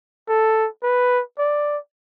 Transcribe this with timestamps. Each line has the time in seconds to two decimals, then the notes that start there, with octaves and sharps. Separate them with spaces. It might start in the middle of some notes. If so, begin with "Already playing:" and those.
0.28 A4
0.83 B4
1.38 D5